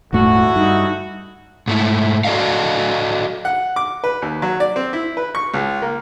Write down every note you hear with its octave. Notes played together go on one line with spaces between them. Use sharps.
D#1 G#2 D3 A3 E4 F#4
G2 D#4
G#2 A3 E4
F#4 A4 D5 D#5 F5
F#5
D6
B4
D#2
F#3
D5
C4
E4
B4
C#6
C#2
A#3